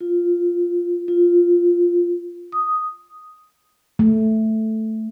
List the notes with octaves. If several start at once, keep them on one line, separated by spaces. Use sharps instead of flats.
F4
F4
D#6
A3